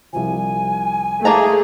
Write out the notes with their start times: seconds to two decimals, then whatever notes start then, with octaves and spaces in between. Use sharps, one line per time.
0.13 C2 F3 G#5
1.25 A3 A#3 G#4 A5 A#5